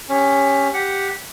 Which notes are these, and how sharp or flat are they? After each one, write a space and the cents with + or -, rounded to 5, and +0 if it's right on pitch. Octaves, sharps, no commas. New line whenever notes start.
C#4 +0 G4 +25
G4 +0 F#5 +0